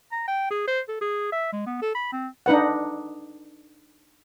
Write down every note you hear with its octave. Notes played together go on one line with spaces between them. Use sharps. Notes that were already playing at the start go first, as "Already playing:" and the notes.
A#5
G5
G#4
C5
A4
G#4
E5
G#3
B3
A4
B5
C4
D4 D#4 B4 F#5